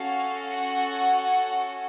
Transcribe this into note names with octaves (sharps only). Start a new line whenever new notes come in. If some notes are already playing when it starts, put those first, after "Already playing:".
Already playing: C#4 F#4 A4 F5
F#5